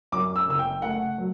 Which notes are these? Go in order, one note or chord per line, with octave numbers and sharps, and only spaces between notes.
F#2 D6
E6
F#1 E6
G5
A3 F#5
F#3